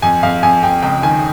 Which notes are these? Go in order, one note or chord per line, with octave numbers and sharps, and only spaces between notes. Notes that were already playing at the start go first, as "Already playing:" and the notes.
F2 G#5
F2 F5
F2 G#5
F2 G5
C#2 G5
D#3 G#5